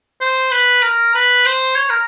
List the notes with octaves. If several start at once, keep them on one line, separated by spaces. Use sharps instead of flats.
C5
B4
A#4
B4
C5
C#5
A#4